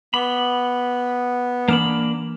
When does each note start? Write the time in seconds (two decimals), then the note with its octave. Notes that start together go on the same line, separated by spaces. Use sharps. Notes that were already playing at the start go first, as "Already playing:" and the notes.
0.14 B3 B5 D6 F7 G7
1.68 E3 A#3 D4 B5 F6 F7